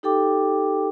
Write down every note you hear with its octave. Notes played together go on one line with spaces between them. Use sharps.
D#4 G4 A4 G5 D6